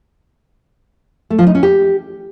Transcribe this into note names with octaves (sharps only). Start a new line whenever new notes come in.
A3
F3
D#4
C#4
G4